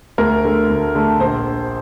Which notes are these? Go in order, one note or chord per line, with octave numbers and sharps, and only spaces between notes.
D2 A#4
D3 A3
D2
D3 A3
A#1 C5